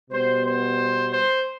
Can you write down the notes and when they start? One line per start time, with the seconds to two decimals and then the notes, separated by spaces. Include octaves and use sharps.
0.10 B2 G3 B3 C5
0.44 C5
1.11 C5